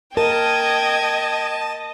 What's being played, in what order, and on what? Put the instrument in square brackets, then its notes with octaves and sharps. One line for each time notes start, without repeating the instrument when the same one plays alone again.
[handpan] A#4 [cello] D#5 [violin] G5 G#6 [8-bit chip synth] A5